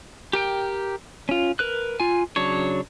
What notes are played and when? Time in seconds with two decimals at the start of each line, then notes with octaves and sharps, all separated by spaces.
0.33 G4 A#4 G5
1.29 C#4 F4
1.59 A#4 B4 F#6
2.00 F4 G#5
2.36 C#3 F#3 D4 C#5